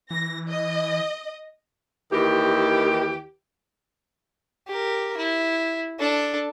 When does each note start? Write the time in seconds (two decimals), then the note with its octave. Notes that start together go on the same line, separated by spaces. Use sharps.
0.11 E3 A#6
0.49 D#5
2.12 D#2 D#3 E3 G4
4.68 G4 A#4
5.17 E4
5.99 D4 A4